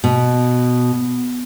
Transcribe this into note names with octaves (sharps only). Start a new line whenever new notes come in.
B2